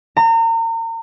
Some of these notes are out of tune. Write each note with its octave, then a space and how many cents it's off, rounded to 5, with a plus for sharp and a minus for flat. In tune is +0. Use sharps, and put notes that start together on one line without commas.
A#5 -35